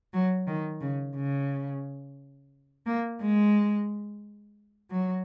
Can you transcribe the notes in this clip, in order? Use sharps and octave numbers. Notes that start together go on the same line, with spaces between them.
F#3
D#3
C#3
C#3
A#3
G#3
F#3